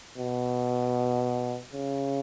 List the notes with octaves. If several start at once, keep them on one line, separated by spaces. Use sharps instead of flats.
B2
C#3